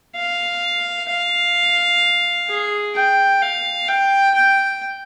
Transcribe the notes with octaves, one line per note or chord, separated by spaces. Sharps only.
F5
F5
G#4
G5
F5
G5
G5